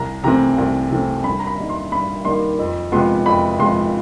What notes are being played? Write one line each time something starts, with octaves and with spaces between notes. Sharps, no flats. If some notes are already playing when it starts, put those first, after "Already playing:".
Already playing: C2 A#5
C3 E3 A3 C4 A#5
C2
C3 E3 A3 C4
G2 B5
A#5
B5
D#3 G3 A#3 D#4
C6
G2 B5
D#3 G3 A#3 D#4 C6
F2
C3 F3 G#3 B3 C6
F2 B5
C3 F3 G#3 B3 C6